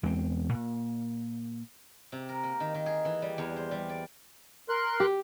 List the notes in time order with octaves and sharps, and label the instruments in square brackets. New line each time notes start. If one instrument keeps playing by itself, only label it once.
[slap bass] E2 G#3 B3 C4
A#2
[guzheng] C3
A#4
A#3
D#3
D#3
G#4
E3
G3
E2
C5
G3
D5
[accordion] A#4 C6 F#6
[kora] G4